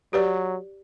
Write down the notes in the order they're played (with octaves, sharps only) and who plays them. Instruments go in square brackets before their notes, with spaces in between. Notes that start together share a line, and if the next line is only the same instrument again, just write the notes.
[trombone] F#3 [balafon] G4 B4 D5